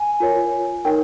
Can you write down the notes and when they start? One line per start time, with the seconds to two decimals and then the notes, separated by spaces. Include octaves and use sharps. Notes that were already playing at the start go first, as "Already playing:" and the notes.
Already playing: G#5
0.20 F4 A#4 C#5
0.85 D#4 A#4 C#5 G5